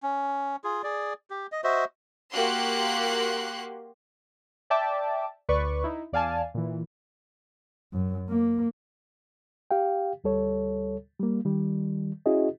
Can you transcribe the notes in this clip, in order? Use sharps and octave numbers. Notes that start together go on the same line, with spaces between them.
C#4
F4 G#4
G#4 D5
G4
D#5
F#4 C5 D#5 E5
A#3 F#4 G4 C6 F#6
D5 E5 G5 A5 D6
D2 B4 D5 C#6
D#4 E4
E2 D5 F5 G#5 A5
A#2 E3
F#2
A#3
G4 F5 G5
D2 G3 A4 C#5
G3 A#3
D#3 G3
C#4 E4 F#4 G#4 D#5